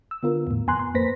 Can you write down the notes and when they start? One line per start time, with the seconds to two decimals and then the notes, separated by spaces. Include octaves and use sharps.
0.11 E6
0.23 D3 B3 F4 A#4
0.47 E2 A2
0.67 F2 B3 G#5 A#5 C6 F#6
0.79 C6
0.94 F2 A#3 B4 C5 A#6 B6